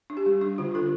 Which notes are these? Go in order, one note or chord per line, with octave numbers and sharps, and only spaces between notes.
D4
G4
G3
D4
D3 F4
D4 A4